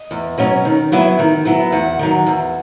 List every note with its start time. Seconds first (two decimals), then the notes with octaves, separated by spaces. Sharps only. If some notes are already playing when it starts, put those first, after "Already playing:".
Already playing: D#5
0.11 E2
0.38 B2 F#3 C#4
0.65 D#3
0.92 F#3 B3 E4
1.19 D#3
1.45 F#3 B3 E4
1.72 E2 F#5
1.99 D#3 F#3
2.26 E2